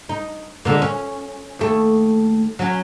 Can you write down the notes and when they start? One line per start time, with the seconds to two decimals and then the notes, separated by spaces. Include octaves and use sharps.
0.09 D#4
0.65 A#2 D3 G#3
0.82 C#4
1.59 D#2 A3
2.59 F#3 C#4